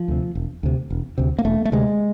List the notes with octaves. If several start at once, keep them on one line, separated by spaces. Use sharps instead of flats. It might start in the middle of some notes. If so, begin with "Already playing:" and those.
Already playing: F3
D2 C3
E1
D2 C3
E1
D2 C3
A#3
E1 A3
A3
D2 C3 G#3